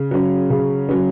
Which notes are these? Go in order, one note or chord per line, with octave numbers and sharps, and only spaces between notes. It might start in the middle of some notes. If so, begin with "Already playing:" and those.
Already playing: C#3
F#3 C#4
C#3
F#3 C#4